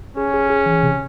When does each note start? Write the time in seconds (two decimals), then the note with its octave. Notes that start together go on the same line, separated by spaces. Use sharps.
0.16 C#4 G#4
0.34 G#4
0.50 G#4
0.66 E3
0.83 C3